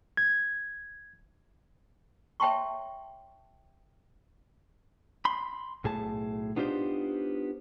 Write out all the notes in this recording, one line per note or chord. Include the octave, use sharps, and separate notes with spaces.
G#6
C#5 E5 G5 A5 C6 C#6
B5 C6
B1 A2 G#4 A5
B3 D4 D#4 F4 G4 C5